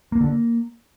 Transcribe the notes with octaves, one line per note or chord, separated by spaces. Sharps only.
A#3
D3
A#3